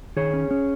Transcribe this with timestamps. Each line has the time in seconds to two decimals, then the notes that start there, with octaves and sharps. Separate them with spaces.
0.16 D#3 G#4 C#5
0.33 C#4
0.51 C#4